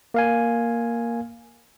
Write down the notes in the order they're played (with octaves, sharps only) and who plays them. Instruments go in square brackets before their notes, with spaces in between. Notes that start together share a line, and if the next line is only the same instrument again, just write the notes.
[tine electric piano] A#3 F5 G#5